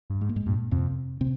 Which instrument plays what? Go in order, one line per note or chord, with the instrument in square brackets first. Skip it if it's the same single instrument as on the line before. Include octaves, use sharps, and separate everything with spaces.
[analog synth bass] G2
[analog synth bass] G#2 [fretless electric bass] G#3
[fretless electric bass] A#3
G#2 G#3
[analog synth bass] G2 [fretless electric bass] A#2 A#3
[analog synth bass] F2 [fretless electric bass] C3 C4
[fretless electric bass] C3 C4